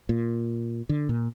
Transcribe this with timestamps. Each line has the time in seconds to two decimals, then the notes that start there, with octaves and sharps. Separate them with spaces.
0.09 A#2
0.89 D3
1.09 A#2